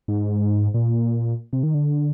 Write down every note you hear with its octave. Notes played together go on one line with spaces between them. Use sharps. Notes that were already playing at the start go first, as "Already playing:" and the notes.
G#2
A#2
C3
D#3
D3